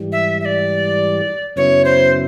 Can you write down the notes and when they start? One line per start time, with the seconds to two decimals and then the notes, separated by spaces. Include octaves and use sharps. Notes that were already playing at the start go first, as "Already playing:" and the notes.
Already playing: G#2 E3 G3
0.12 E5
0.40 E5
0.45 D5
1.56 F#2 C#3 F#3 B3 E4 C#5
1.85 C5